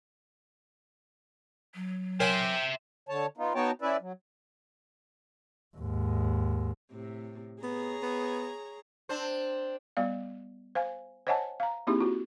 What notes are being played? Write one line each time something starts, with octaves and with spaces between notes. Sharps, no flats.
F#3
A#4 C5 C#5 E5 G5 G#5
D3 C#5 A5
B3 D#4 F4
B3 D#4 F#4 C#5 G5 A5
C#4 E4 B4 D5 E5
F#3
D#2 G#2
A2 C3
B3 G#4 C#5 A#5
B3
C4 D4 C5
G3 B3 D5 F5
C5 F5 G#5
C5 C#5 D#5 F#5 G#5 A5
F5 A#5
A#3 C4 D#4 E4 G4 G#4
F4 F#4